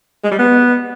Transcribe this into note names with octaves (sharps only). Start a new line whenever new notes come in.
G#3
G3
B3